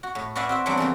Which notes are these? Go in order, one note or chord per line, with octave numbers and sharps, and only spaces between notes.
F#4
A2
F#4 B4 D5 E5 F5 G#5
C4 F#4 E5
E3 F#3 G3 B3 C4 D4
F2 C#3 E3 A#3